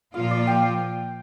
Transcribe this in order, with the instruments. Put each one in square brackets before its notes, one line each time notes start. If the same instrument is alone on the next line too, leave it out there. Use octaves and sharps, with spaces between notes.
[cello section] A#2 F3 A#3 F4 [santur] F5
[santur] D5
G5